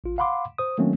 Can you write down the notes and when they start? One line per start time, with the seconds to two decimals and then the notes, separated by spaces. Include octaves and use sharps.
0.04 A1 F4
0.18 F5 F#5 B5 C6 D6
0.58 C5 D#6
0.78 D#3 F#3 A3 A#3 C4 C#4